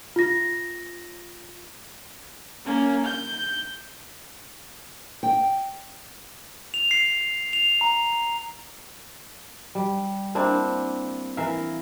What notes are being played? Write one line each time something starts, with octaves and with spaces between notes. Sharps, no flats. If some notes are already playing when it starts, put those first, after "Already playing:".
F4 A#6
A#3 C#4
G6
G5
F7
C7
F7
A#5
G3
A#3 C4 D4 E4
E3 A#4 E5 F5